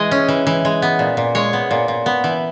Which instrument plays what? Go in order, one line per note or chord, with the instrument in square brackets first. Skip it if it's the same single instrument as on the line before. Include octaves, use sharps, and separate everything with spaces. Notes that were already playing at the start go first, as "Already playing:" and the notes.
Already playing: [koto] E3 G#3 D#5
C#4
E3
E3
G#3
B3
A#2
A#2
G#3 C#5
B3
A#2
A#2
B3
E3